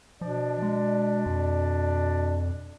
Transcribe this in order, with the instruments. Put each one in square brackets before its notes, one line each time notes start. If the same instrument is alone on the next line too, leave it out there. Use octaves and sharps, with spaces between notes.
[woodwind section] B2 D4 D5 [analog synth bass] F3
[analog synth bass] G#3
F2